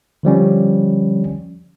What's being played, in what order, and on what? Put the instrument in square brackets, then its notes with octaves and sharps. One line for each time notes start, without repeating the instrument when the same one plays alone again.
[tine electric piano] D3 F3 G3 C#4